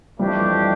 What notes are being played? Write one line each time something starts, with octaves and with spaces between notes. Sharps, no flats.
F2 E3 G3 A3 D4 G4